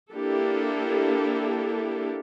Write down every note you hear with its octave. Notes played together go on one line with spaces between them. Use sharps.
A#3 D4 E4 G4 A4